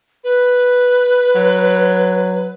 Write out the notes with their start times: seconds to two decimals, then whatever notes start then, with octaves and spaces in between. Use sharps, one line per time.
0.24 B4
1.35 F#3